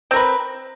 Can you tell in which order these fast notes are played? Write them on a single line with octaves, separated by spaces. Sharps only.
C4 A#4 B4